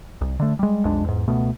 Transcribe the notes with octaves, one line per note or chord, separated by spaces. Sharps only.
C2
D3 A3
G3 G#3
B1 F2 G#3 D4
E2 G#2
C#2 B2 A3 B3